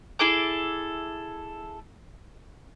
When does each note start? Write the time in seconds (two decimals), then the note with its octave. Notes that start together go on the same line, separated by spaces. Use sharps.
0.19 E4 G#4 A4 D6